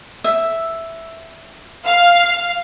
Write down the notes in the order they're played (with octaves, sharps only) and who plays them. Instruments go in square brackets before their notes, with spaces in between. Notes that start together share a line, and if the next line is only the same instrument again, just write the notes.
[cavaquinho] E5
[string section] F5